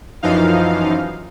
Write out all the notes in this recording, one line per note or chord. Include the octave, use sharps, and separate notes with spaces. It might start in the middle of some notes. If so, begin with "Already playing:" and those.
F#2 E3 F3 D#4 F5